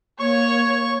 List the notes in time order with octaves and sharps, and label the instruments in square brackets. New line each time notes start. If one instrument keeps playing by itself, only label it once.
[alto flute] A#3 [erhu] C#5 [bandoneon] C#6